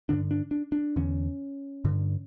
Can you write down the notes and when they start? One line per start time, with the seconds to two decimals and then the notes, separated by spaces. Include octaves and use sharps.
0.09 G2 D3 D4
0.31 D4
0.51 D4
0.72 D4
0.96 E2 D3 C#4
1.85 G2 D3